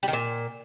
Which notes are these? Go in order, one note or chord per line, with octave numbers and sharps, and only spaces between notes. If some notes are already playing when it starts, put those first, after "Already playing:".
G3
D#3
A#2